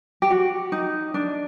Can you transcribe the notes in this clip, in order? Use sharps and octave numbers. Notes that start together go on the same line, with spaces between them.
G4
F#4
D#4
D4